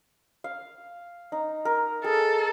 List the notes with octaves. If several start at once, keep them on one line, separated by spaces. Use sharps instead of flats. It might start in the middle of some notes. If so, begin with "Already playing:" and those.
F5
D#4
A#4
G#4 A4